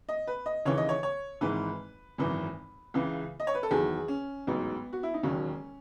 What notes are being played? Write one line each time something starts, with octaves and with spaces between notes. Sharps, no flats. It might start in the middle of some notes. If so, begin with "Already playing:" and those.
D#5
B4
D#5
D#2 C#3 E3 C#5
D#5
C#5
C#5
G#1 G#2 E3 B4
G#1 F#2 E3
C#2 C#3 E3
D#5
C#5
B4
A4
E2 D#3 F#3 G#4
C#4
A1 G#2 F#3 B3
F#4
E4
D#4
E1 D#2 D#3 F#3 C#4